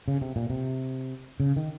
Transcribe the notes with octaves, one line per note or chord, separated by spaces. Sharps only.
C#3
C3
A#2
C3
C#3
D#3